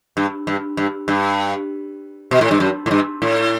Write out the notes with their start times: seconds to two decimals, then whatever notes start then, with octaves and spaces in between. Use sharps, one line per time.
0.17 G2
0.47 G2
0.77 G2
1.08 G2
2.31 B2
2.41 A2
2.51 G2
2.60 F#2
2.86 A2
2.91 G2
3.22 A2